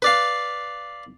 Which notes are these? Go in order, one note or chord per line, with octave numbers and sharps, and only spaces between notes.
B4 D5 F5